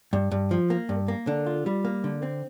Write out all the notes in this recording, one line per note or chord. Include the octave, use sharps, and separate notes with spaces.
G2
G2
F3
A#3
G2
A#3
D3
F4
G3
A#3
D3
C4